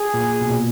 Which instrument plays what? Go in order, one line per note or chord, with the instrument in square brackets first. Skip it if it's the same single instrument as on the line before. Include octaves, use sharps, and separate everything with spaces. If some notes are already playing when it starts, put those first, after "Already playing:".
Already playing: [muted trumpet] G#4
[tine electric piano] A#2
B2
A#2